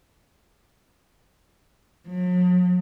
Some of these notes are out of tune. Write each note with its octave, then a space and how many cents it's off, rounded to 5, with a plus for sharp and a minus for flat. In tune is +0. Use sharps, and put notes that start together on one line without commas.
F#3 -45